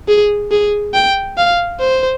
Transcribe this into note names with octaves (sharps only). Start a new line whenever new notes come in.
G#4
G#4
G5
F5
C5